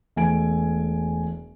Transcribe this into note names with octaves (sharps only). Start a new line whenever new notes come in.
E1 A3 G#5 D7